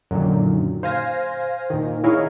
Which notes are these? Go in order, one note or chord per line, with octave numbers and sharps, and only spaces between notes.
F#2 A#2 D3 D#3
C5 F5 G#5 A#6
A#2 D#3
E4 G#4 A#4 C#5 D#5 F5